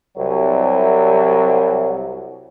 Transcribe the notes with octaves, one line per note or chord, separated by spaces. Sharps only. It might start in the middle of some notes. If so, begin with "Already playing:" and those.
C2 F#3